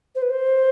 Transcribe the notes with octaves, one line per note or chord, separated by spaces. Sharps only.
C5
B4
C5